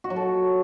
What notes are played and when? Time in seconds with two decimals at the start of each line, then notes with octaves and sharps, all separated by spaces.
0.04 F#4
0.10 F#3
0.16 A4